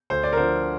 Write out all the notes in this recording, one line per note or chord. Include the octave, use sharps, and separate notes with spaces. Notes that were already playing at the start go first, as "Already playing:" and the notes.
D2 C5
D5
A#4
D3 F3 C5